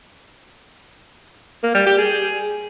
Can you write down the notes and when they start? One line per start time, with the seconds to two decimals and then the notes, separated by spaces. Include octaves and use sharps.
1.63 A#3
1.75 G3
1.86 G4
1.98 G#4